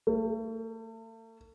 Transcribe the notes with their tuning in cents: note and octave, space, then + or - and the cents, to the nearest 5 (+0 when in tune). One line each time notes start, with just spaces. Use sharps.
A3 +40